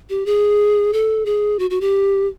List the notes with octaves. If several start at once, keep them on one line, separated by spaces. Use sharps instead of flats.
G4
G#4
A4
G#4
F#4
F#4
G4